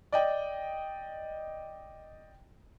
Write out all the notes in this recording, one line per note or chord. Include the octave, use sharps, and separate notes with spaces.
D5 D#5 G5